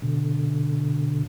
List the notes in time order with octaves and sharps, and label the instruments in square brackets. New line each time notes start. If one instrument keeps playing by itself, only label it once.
[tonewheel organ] B2 D3